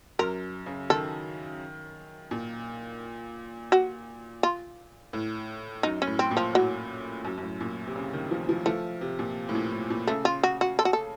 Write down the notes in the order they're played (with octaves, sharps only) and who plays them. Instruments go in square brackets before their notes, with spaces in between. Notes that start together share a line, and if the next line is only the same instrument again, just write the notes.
[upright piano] F#2 [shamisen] A#4
[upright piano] C#3
[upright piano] D#3 [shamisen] A4
[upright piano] A#2
[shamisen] F#4
F4
[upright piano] A2
[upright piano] F#2 [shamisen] D#4
[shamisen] C#4
[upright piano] A2
[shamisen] C4
[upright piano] A#2
[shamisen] F3
[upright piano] A2 [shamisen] F#3
[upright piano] F#2
F#2
A2
A#2
C3
C#3
D#3
F3
F3
[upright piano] F3 [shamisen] A3
[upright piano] C3
A#2
A2
A#2
A2
A#2
[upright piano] C#3 [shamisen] A3
[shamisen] F4
F#4
F#4
A4
F#4
A4